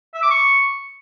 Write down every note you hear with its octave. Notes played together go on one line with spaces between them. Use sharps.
E5
D6
C#6